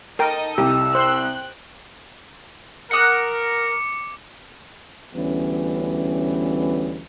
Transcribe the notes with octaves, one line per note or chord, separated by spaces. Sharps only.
D#4 A4 A#4 D#5 G5
C2 G4 E6
C5 G5 C6 F#6
A#4 F#5 D6 D#6 F#6 C#7
D2 E3 G3 B3 C#4